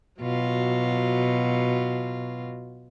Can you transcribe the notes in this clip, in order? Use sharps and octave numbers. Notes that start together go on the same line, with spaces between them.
B2 F#3 F4